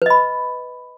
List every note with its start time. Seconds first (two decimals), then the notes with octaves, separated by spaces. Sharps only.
0.02 B4
0.06 D#5
0.10 B5